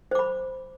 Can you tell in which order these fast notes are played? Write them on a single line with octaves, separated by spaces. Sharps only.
C5 D6 B5